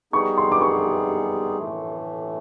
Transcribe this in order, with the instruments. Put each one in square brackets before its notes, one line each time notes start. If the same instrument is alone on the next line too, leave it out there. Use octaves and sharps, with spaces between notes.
[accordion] G3 B3 D#4 G#4 [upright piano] C#6
[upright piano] C6
D6
C#6
[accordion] A2 E3 A3